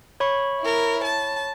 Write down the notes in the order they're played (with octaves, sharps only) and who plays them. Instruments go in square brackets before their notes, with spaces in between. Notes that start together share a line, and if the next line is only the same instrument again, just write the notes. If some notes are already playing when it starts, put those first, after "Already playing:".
[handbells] C#5 B5 C#6
[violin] E4 A#4
A5